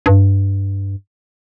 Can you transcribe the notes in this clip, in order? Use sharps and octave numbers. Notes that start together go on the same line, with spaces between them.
G2